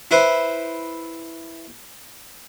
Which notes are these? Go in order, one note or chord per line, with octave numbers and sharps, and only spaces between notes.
E4 B4 C5